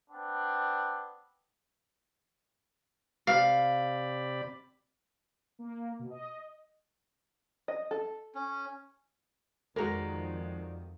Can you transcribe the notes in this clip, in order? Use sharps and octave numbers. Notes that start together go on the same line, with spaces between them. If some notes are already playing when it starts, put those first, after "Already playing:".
B3 C4 D4
C3 D5 F5 B5
A#3
B2
D#5
D#5
A4
C#4
F2 D#3 G#3 F#4 A#4 D5 A#5